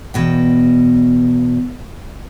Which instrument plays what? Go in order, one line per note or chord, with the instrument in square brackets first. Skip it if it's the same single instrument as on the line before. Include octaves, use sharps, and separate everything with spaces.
[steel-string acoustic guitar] E2 B2 G5